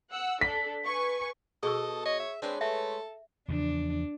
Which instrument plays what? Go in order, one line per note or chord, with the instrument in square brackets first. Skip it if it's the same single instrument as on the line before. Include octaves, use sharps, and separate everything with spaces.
[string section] F#5 E6
[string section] D4 A4 [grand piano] B6
[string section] B4 G#5 C#6
[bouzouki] B2 [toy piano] G#4 C#6 E6 [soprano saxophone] A4 [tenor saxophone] D#5
[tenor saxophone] C#5 [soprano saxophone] D#5
[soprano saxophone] E5
[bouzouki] G#3 B4 C#5 [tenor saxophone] C4 [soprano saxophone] D4
[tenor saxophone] A3 [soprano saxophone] A4 [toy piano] E5
[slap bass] E2 C#3 F3 [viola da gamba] D4